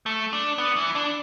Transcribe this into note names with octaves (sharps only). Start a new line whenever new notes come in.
A3
D4
B3
E3
D4